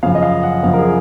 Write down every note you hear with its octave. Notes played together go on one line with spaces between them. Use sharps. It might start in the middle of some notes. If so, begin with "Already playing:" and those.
F#2 C#3 F3 F5
D#5
F5
F#5
F#2 C#3 F3 F5
A#4
G#4